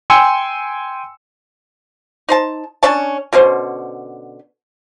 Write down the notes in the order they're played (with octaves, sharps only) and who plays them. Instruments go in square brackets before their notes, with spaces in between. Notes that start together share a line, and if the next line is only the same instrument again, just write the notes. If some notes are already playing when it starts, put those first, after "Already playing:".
[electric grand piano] G5 G#5 C6 E6 C#7
[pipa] D#4 C5 A5
C#4 D4 C#5 A5
B2 D3 C#4 C5